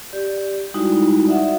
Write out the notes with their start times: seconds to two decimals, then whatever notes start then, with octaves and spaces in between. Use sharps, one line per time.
0.13 G4 D5
0.74 G3 G#3 D#4 E4 F#4
1.27 D5 E5 F#5